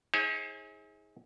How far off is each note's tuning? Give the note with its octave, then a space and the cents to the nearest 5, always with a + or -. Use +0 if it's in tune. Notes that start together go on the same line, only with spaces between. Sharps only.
D#4 +45 G#4 +0 C#5 -45